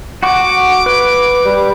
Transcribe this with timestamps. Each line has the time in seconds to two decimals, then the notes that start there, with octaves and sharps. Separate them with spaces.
0.23 F#4 F#5 C#6 D6
0.86 B4
1.44 G3